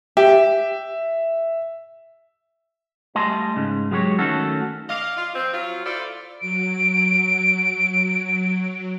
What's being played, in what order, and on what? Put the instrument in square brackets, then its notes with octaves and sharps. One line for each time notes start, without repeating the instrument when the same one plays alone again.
[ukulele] G4 [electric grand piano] E5
[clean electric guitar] G3 A3 D#5 G#5 A5 C6
G#2 C#3
F#3 G#3 G4 A#4 C#5
D#3 A3 C#4 F#4 A4
[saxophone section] D5 D#5 F5
F4
F3 C4
F#3 F4
E4 F4 A4 C5 D5
[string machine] F#3 [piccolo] D7